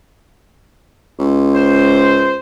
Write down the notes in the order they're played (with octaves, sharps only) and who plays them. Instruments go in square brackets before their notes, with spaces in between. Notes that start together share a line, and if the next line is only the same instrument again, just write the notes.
[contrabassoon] C#2
[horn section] C5